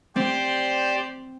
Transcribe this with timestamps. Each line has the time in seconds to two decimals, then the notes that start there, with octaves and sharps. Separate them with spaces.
0.16 C4 G4 C5 D5